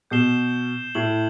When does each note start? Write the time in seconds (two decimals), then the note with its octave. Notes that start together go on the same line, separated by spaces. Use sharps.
0.11 B2 G6 C7 E7 G7
0.95 A2 G6 C7 F#7